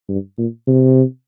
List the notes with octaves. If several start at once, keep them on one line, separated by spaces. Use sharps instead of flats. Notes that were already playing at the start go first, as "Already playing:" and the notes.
G2
A#2
C3